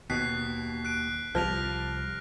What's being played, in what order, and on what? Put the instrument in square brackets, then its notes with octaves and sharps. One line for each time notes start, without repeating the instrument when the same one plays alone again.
[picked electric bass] D#2 [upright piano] B2 [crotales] F#6 B6 C7
[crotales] F#6 D7
[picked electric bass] C2 G3 [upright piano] F3 [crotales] F6 A#6 F7